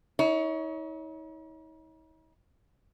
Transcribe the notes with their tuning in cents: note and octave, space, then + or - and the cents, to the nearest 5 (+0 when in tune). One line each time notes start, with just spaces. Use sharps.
D#4 +45 C#5 +20